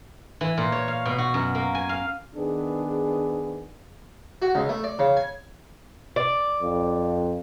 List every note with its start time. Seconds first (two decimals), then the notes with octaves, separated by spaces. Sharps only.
0.41 E3
0.58 A#2
0.72 C#5
0.88 F5
1.05 B2
1.18 F#4
1.34 F#2
1.55 A#3
1.75 G#5
1.89 F5
2.36 D#3 B3 D4 G#4
4.42 F#4
4.55 C#2
4.69 A3
4.84 D5
4.99 C#3
5.17 G#5
6.16 D5
6.62 F2